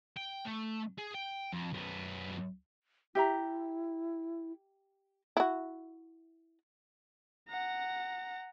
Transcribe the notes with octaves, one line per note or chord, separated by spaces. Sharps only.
G5
A3
G#4
G5
F2
F#2 B3
E4 G4 E5 A#5
E4 F#4
F#5 A#5